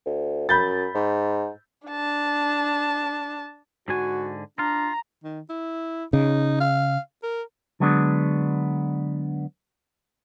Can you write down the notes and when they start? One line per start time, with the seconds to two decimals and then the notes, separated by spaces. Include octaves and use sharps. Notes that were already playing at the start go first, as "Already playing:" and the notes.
0.06 D2
0.49 F#2 B5 G6 A6
0.95 G#2
1.88 D4 A5
3.88 G#2 D3 F#4 G#5
4.59 D4 F4 A#5
5.24 D#3
5.50 E4
6.13 C#3 D#4
6.60 F5
7.23 A#4
7.80 D3 F#3 G#3 B3 D4